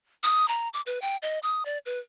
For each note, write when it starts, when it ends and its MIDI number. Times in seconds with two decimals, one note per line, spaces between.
0.23 0.48 87
0.48 0.69 82
0.74 0.81 86
0.86 0.99 71
1.02 1.17 79
1.22 1.39 75
1.43 1.63 87
1.65 1.78 74
1.86 1.99 71